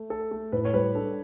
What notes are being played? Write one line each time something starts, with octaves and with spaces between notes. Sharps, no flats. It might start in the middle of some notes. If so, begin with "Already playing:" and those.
Already playing: A3
A4
A3
A2 B4
C#5
G3 B4
D4 A4